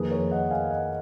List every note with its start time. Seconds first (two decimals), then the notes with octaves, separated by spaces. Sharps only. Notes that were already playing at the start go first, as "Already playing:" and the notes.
Already playing: F2 D#3 A#3 G#4 B4
0.11 A#4 C#5
0.31 D#5 F#5
0.51 F5 G#5
0.71 D#5 F#5